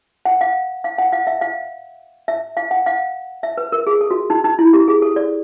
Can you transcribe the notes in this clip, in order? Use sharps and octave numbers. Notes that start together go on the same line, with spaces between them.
F#5
F5
F5
F#5
F5
E5
F5
E5
F5
F#5
F5
E5
B4
A#4
G#4
A4
F#4
D#4
D#4
E4
G4
G#4
A4
D5